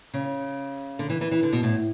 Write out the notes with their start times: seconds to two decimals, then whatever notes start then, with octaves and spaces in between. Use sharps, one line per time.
0.14 C#3
0.99 D3
1.10 E3
1.21 E3
1.31 E3
1.43 D3
1.53 B2
1.63 A2